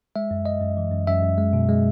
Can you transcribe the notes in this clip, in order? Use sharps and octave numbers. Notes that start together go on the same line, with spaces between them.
G#3 E5
F#2
F#2 D#5
F#2
E3
F#2
F#2 E5
F#2
G#3
B2
G#3